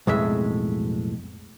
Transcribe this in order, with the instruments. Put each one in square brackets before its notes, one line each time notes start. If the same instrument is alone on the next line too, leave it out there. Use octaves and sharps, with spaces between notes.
[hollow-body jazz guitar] B1 F2 A2 G#3 E5